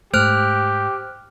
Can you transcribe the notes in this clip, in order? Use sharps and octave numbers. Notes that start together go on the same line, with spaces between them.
G#2 A3 G4 C5 F6 F#6